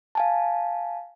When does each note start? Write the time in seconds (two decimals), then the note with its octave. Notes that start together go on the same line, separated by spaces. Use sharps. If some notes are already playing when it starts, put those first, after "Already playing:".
0.15 F5 G#5 A5